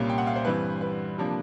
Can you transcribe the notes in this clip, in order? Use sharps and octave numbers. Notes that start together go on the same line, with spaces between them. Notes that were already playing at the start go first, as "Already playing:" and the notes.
Already playing: C2 A#2 G3 A#3 C#4
G5
F#5
F5
C5
G2 E3 G3 C4 B4
B4
C3 F3 A#3 D4